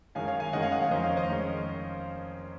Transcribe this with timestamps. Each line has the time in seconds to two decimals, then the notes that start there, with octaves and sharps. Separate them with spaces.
0.15 F#2 D#3 G#3 C#4 F5 G#5
0.27 C#5 F5
0.40 F5 G#5
0.53 F#2 D#3 G#3 C#4 D#5 F#5
0.62 F5 G#5
0.72 D#5 F#5
0.82 C#5 F5
0.91 F2 D#3 G#3 C#4 C5 D#5
1.04 C#5 F5
1.17 C5 D#5
1.29 D#3 G#3 C#4